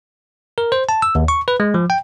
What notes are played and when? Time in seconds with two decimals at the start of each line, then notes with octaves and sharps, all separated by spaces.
0.58 A#4
0.72 C5
0.89 A5
1.02 E6
1.15 D#2
1.28 C#6
1.48 B4
1.60 G#3
1.74 F3
1.90 G5